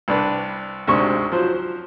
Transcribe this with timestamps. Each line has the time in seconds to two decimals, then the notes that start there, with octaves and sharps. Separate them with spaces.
0.08 C2 D4 B4
0.88 D2 G#2 C3 C4 C#6
1.32 F3 F#3 C5